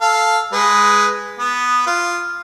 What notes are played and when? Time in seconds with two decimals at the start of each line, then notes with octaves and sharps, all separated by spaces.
0.01 A4 F5
0.53 G#3 B4
1.39 B3
1.87 F4